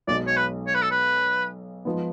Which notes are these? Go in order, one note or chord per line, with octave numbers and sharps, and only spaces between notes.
B1 B2 G#3 D5
C#5
B4
C#5
B4
A4
B4
F3 G#3 B3